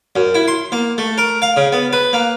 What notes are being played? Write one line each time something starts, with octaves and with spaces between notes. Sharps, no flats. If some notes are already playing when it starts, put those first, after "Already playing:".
F#2
E4
C6
A#3
A3
A#4
F5
C#3
B3
B4
A#3